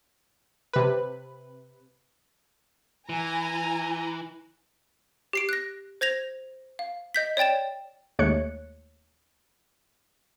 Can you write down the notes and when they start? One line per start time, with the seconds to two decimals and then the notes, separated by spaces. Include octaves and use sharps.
0.73 C3 B4
3.09 E3 G#5 A#5
5.33 G4 C7 D7
5.49 F#6 A#6
6.01 C5 G#6 A#6 F7
6.79 F5
7.14 D#5 G6 B6
7.37 C#5 D5 G5 A6 E7
8.19 D#2 G#3 A3 C#5 F#6 C#7